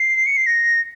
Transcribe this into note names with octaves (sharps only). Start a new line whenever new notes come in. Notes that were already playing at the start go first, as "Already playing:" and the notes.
Already playing: C7
C#7
C7
A#6